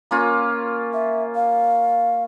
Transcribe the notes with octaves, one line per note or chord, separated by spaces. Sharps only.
A#3 C#4 F4
E5
F5